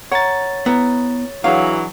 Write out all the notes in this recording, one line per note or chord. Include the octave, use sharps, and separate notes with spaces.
C#5 F#5 A#5 A6
B3 E4 B4 A#5
E3 F#3 D4 G#4 F5